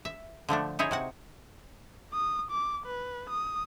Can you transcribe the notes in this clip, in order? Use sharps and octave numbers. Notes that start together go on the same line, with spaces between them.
E5
D3 F3 A3 D4
D#4 E4 G#4 C5 C#5
C3 F#4 F#5
D#6
D6
B4
D#6